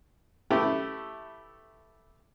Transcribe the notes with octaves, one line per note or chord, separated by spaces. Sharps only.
A3 E4 G4 B4